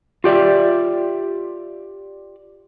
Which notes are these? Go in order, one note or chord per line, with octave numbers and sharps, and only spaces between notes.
F4 G4 D5 E5